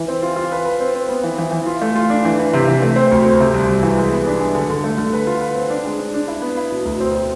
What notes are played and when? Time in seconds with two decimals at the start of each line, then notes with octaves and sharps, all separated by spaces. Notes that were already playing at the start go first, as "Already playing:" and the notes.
Already playing: E3
0.08 C4
0.23 F4
0.36 F4
0.52 B4
0.65 B4
0.80 C4
0.95 C4
1.09 B3
1.24 E3
1.38 E3
1.52 E3
1.66 F4
1.82 A3
1.95 F4
2.10 D4
2.25 E3
2.39 E3
2.53 C3
2.68 E3
2.82 A3
2.96 C4
3.11 D2
3.25 C4
3.40 C3
3.54 C2
3.69 C2
3.83 E3
3.97 G#3
4.12 B3
4.27 D4
4.40 G#3
4.55 D3
4.70 D3
4.84 A3
4.98 D3
5.13 B4
5.27 F4
5.41 B4
5.55 C4
5.70 D4
5.85 G#3
5.99 D4
6.14 D4
6.28 E4
6.42 B3
6.57 E4
6.71 B2
6.85 D2
7.00 C4
7.15 C4